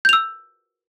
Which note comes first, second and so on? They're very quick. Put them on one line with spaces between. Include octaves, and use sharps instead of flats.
G6 F7 E6